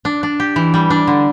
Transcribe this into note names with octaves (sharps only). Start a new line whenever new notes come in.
D4
D4
G4
E3
G3
D4
D3